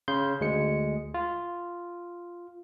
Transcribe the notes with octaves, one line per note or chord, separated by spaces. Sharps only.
C#3 C6 G6
D2 G#3 C#7
F4